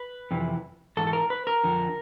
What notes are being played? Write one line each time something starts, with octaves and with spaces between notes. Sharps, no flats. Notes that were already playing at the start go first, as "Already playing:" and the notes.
Already playing: B4
F2 C3 E3
G#2 E3 A4
A4
A#4
B4
A#4
F2 D3 F3